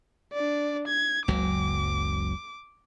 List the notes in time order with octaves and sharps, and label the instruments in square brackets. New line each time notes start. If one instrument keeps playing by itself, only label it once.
[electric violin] D4 D5
G#6
[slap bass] F#1 C#2 F#3 [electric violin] D6